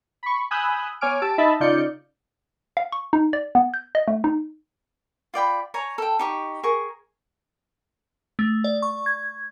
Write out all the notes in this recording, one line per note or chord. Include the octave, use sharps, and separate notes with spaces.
B5 C#6
G#5 B5 D#6 E6 F#6 G6
B3 C#5 G#5 D6 F6 D7
G4 A5 E6 D7
D#4 D#5 E5 A5 B5
C#3 D#4 F4 D5 G6 C#7
F5
C#6
D#4
D5
B3
G6
D#5
A3
D#4
F4 D5 G5 B5
C#5 G#5 A#5
A4 G5
D#4 G4 C#6
G#4 A#4 C#6
A3
D5
C#6
G#6